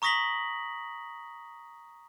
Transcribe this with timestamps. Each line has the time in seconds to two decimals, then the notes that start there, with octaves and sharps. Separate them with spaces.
0.02 A#5 C#6 D#6 A#6 B6 F#7